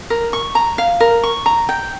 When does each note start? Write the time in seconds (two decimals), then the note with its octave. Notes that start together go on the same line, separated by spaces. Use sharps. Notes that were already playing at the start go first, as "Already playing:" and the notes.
0.10 A#4
0.33 C#6
0.55 A#5
0.78 F5
1.00 A#4
1.23 C#6
1.46 A#5
1.69 G5